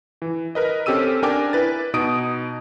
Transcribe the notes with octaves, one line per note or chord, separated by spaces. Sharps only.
E3
A#4 B4 D#5
C4 C#4 G4 A4 E6 D#7
D4 A#4 G5 G#5 D6
E4 B4 A6
B2 D#4 D#6 D7